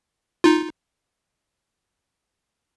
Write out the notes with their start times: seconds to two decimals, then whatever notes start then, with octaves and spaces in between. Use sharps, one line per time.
0.44 D#4 F4